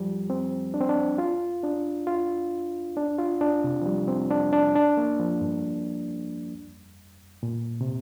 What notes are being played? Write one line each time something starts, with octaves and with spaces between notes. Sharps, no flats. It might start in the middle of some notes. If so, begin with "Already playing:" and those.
Already playing: F3 G3
C4
D4
C4
D4
F4
D4
F4
D4
F4
D4
C3
F3
G3
C4
D4
D4
D4
A#3
F3
G2
A#2
C3